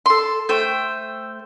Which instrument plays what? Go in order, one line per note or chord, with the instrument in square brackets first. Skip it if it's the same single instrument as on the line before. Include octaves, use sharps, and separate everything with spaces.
[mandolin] A4 C6
A3 C5 G5